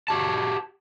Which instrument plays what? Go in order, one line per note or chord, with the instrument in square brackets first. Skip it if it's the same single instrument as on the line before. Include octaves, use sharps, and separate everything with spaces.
[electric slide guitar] F#4 G4 A5